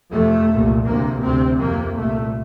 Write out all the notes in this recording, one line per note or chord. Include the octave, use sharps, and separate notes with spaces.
F2 C3 A3
C2 A#2
D2 C3 A#3
D2 C3 C4
F2 C3 A#3
C2 A#2 A3